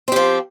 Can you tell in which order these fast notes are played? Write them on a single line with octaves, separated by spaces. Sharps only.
C4 G4 F3